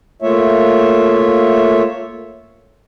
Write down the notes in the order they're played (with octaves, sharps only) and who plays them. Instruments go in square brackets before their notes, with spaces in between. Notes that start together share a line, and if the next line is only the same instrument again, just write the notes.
[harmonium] A3 A#3 F4 C#5 E5